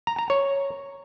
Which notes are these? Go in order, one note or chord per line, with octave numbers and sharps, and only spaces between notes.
A#5
A#5
C#5